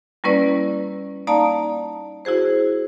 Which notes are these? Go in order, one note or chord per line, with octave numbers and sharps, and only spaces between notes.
G3 A#3 C#4 E4 B4 D5
A#3 D#4 D5 F5 A5 A#5
E4 F#4 G#4 C5